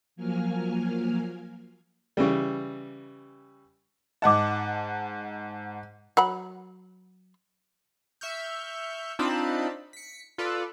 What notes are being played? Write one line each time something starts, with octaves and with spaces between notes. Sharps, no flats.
F3 F#3 A#3 G#5 F6
C#3 E3 G3
G#2 D#5 F#5 A5 D6
F#3 F#5 B5
E5 C#6 F6 G6
C4 D4 D#4 F4 A5 B5
B6 C#7
F4 A4 B4 D5